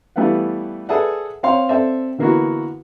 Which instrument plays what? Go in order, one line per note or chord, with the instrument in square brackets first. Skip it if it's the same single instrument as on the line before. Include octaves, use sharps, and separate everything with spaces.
[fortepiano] E3 G3 A3 B3 F5 F#5
G#4 A4 B4 D5 E5 F#5
C4 C#5 F5 G5 C6
C4 A4 D5 E5
D3 E3 A#3 B3 E4 F#4